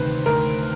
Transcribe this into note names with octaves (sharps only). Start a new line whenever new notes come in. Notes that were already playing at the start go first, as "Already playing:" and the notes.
Already playing: D2 C3 D#3 B4 C5
D2 A#4